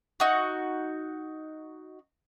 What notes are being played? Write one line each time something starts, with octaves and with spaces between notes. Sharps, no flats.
D#4 F#4